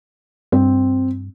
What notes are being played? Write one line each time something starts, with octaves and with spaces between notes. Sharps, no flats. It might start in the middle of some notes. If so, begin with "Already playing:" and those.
G2 C4